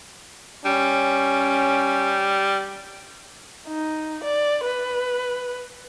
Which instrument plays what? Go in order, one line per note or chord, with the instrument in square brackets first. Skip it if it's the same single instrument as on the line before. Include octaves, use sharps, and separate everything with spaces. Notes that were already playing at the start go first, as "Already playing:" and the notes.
[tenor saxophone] G3 [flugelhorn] C#4
[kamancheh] D#4
D5
B4